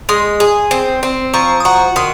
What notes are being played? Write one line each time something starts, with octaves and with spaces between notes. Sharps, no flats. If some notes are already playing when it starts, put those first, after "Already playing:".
G#3 C6 D#6
G#4
C4
C4
F3 A#5 C#6
D#6
F#4 A#5 C#6
D#3 C6 D#6